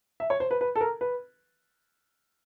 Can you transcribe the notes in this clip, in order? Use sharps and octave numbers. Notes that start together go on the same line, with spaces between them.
E5
C#5
C5
B4
B4
A4
A#4
B4